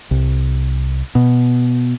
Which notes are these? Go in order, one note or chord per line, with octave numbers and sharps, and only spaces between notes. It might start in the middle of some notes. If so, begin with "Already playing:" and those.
C2
B2